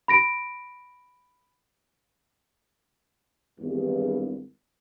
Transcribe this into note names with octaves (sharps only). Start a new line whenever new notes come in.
B5 A#6 D7
G#1 E2 G2